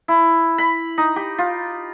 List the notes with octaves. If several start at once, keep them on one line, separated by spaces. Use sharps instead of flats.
E4
B5
D#4
G4
F4